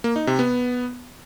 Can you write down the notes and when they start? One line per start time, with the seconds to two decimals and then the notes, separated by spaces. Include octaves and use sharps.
0.04 A#3
0.16 D#4
0.27 C3
0.39 B3